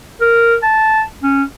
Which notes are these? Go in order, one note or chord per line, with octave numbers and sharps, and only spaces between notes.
A#4
A5
C#4